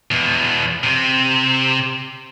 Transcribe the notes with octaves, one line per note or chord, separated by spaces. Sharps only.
E2 B2
C3